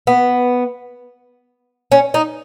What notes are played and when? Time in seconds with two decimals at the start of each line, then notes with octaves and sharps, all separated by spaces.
0.07 B3
1.92 C#4
2.14 D#4